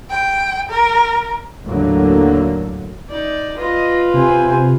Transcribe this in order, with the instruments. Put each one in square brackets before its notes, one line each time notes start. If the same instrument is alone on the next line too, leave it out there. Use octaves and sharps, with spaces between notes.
[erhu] G5
A#4
[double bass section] D#2 A2 D3 F#3 A#3
[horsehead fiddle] D#4 [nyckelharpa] D5
[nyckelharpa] F4 B4 [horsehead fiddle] D#5
[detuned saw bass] C3 [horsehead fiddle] C4 G#5